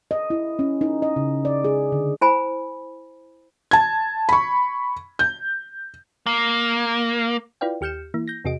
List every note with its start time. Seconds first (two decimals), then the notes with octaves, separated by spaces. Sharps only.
0.11 D#5
0.30 E4
0.59 C#4
0.81 D#4
1.02 D#5
1.16 C#3
1.45 D5
1.64 G#4
1.92 D3
2.21 E4 C5 G#5 B5
3.71 A5 G#6
4.29 B5 C#6
5.19 G6
6.26 A#3
7.61 E4 F4 B4 D5 F5 G5
7.81 D#2 G4 F6 G6 C#7 E7
8.14 E3 A#3 E4
8.28 G6 A#6
8.45 E2 C3 F#4 G#4 D#5 D7